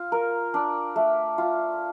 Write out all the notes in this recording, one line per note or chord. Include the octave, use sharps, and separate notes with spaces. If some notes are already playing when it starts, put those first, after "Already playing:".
Already playing: F4
A#4
D4
A3
F4